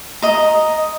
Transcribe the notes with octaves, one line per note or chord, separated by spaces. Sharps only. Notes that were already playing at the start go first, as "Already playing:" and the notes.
D#5 A#5